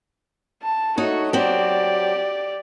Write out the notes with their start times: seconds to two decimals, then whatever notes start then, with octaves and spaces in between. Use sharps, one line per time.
0.63 A5
0.97 A3 D#4 F#4 C#5
1.33 F#3 C4 G4 D5